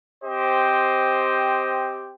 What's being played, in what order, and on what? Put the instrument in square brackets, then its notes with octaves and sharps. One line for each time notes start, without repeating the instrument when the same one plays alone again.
[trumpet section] C4 G4 C5 D#5